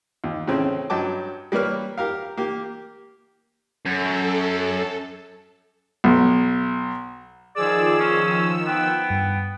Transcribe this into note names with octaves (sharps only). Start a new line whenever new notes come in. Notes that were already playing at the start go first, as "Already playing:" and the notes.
D#2
A2 C#3 C4 C#4
G2 F#3 D#5 G5 A5 D6
G3 A#3 A#4 B4 C#5 F6
G4 A#4 F5
A#3 G4
F#2 A4
B1
D#3 F3 G#4 D5 E6
C#4
B3 G5
G2